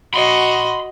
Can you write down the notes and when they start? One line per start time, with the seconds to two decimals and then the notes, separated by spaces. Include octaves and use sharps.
0.14 F#4 D#5 B5 C6